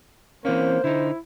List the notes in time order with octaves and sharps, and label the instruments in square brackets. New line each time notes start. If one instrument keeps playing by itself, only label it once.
[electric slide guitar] E3 C4 C#4 [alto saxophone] A#3 [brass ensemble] C5
[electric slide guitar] D3 D#4 [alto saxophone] E4